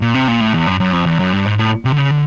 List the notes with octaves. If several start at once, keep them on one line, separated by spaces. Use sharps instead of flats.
A#2
C3
A#2
A2
E2
F#2
F#2
F2
E2
F#2
G2
G#2
A2
C3
D3
C#3
D3